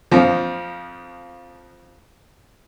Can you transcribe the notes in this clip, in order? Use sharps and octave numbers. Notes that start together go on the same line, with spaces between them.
F2 F3